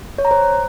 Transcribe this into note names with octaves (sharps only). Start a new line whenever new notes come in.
C#5
A#5
C5